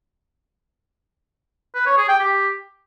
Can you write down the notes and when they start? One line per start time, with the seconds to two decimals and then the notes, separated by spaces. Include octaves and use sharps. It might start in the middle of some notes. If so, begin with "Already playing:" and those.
1.75 B4
1.86 C#5
1.97 G#4
2.09 G5
2.20 G4